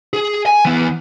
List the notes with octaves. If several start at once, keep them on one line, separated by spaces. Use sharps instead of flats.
G#4
G#5
E3 B3